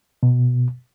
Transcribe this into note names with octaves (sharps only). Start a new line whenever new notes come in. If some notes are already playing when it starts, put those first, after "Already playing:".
B2